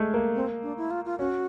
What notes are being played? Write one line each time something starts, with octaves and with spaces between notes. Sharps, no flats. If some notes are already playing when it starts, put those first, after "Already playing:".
Already playing: G#3 A3
A#3
C4
D4
E4
F4
F4
C#4 F#4